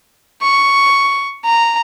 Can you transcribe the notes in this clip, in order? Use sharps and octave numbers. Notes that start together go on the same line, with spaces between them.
C#6
A#5